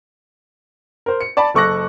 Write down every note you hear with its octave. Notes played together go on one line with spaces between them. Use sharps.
A#4 C5
C#7
D5 A5 B5
F#1 A4 C#6 D6 F#6 A#6